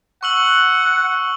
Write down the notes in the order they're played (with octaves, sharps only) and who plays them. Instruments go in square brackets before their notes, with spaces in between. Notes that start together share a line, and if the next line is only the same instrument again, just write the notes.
[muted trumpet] F#5 [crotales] C#6 E6 F#7